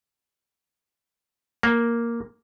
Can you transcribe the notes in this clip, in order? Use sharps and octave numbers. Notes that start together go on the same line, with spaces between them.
A#3